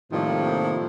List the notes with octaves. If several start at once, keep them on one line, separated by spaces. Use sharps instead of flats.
A2 C3 D#3 F3 G3 A#3